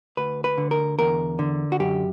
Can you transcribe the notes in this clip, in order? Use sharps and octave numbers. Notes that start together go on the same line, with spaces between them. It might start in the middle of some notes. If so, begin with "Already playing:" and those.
D2 B4
B4
D3
A#4
E2 A#4
D3
F#4
F#2 G4